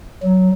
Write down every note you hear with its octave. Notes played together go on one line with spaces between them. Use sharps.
F#3